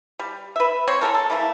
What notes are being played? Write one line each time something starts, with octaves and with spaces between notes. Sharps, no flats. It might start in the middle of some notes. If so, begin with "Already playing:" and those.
G3
B4 E5
C4 C5 C#5
D3 G#3 A4 A#4
A4
C#3 E3 A3 A#3